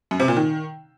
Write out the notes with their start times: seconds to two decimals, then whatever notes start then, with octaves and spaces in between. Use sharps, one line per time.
0.11 F#2
0.20 C3
0.28 A#2
0.37 D#3